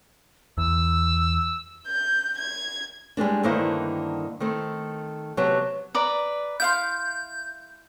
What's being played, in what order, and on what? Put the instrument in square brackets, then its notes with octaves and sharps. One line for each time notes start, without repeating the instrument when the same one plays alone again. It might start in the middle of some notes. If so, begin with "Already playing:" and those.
[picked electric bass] E2 [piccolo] E6
[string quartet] G6
G#6
[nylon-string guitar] G3 G#3 A#3 D4
G2 D3 D#3 A#3 E4 C5
D#3 A3 C4
C3 F#3 B3 G4 A5
[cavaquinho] B4 D5 A#5
[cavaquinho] E4 F5 C6 [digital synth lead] G6